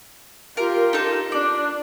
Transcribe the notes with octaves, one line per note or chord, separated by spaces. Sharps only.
F4 G4 A#4
D#4 A4
D4 D5